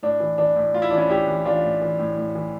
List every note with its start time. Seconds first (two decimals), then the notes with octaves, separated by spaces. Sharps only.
0.03 A2 D4
0.20 E3
0.38 E3 D4
0.56 A2
0.74 A2 F4
0.82 E4
0.91 E3 D4
0.97 C#4 E4
1.09 A2 E4 G4
1.27 E3
1.45 E3 D4 F4
1.63 A2
1.82 E3
1.99 A2
2.18 A2
2.35 E3